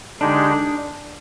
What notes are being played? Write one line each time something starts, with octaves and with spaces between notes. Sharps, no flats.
D3 G#3 D4 D#4 G4